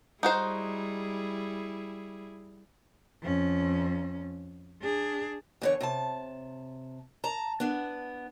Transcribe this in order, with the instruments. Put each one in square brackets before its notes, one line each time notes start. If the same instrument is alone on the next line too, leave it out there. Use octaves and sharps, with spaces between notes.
[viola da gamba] G3 E4 G#4 [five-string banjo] D#4 F#4 C5
[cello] F2 C#4
D4 G#4
[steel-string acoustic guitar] E2 D3 C#5
C3 A5
A5 A#5
B3 D4